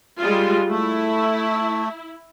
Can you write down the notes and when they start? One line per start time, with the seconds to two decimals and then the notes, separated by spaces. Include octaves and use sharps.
0.18 G3 G#3 F4
0.69 A3 E4